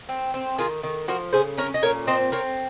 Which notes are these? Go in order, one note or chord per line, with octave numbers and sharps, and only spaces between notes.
C4
C4
D#3 F4 G#4
D#3
F3 F#4 A#4
C#3 G#4 C5
C#4 A#4 C#5
D#5
A#2 A#4 C#5
C4 C5 D#5
C4 A#4 C#5